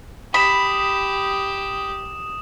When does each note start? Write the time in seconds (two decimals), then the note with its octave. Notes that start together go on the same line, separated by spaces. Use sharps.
0.34 G4 B5 D#6 E7